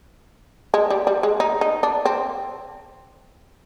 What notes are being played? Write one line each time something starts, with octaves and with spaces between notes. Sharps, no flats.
G#3
G3
G3
G#3
D#4
D#4
D4
C4